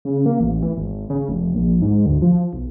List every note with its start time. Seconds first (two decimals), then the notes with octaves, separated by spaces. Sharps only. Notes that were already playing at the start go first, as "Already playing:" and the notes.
0.05 C#3
0.26 A#3
0.40 A1
0.63 E3
0.77 G#1
1.10 C#3
1.28 F1
1.54 A#1
1.82 G#2
2.06 D2
2.22 F3
2.53 B1